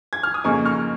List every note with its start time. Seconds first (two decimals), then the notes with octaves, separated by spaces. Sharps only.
0.13 G#6
0.23 F6
0.34 D#6
0.44 F2 C#3 A#3 D#4 G#5 C#6
0.65 C#6 F6